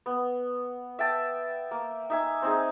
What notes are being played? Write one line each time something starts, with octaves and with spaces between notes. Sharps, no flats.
B3
E5 G5 A5
A#3
D#4 E5 G#5
C4 D#4 G#4